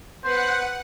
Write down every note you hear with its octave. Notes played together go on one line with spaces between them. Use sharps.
B3 B4 C5 F#5